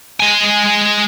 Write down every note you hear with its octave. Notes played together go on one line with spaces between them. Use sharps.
G#3 G#5